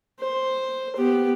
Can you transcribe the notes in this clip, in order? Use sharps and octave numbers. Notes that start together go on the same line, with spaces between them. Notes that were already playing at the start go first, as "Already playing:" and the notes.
C5
B3 G4